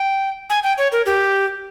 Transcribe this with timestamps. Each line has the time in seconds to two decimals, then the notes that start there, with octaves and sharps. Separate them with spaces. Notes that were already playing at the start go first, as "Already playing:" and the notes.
Already playing: G5
0.50 G#5
0.64 G5
0.78 C#5
0.92 A#4
1.06 G4